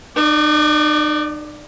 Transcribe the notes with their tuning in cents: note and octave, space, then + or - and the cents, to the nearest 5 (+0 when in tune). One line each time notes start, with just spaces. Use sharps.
D#4 -45 D5 +0